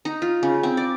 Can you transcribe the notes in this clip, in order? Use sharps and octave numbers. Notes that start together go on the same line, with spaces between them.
D#4
F4
C#3
C4
D5